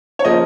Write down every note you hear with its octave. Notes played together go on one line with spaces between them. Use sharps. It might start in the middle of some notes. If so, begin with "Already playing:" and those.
C#5
C#3 F3 A#3 D#5